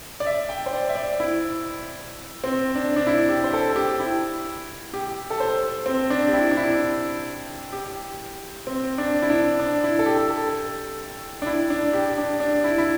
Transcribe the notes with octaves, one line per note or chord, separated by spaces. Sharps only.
D5
E5
G5
C5
D5
E5
D5
E4
C4
D4
D4
E4
G4
C5
A4
G4
E4
G4
A4
C5
C4
D4
G4
E4
D4
E4
G4
C4
D4
E4
D4
D4
E4
A4
G4
A4
D4
E4
D4
G4
D4
D4
E4
E4